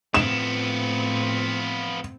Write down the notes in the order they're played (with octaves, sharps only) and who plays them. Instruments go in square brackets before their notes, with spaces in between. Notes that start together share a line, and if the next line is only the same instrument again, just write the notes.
[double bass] A2 C4 [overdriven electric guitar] F3 B3 [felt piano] E7